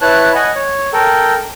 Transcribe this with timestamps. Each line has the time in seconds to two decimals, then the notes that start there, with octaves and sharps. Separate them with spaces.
0.01 E4 B4 C#5 A5 F#6
0.35 D#5 F#5 G#5
0.55 C#5
0.93 A4 A#4 G5